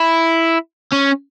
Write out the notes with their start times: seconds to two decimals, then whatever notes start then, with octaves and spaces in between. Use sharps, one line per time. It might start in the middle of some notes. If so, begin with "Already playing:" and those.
Already playing: E4
0.93 C#4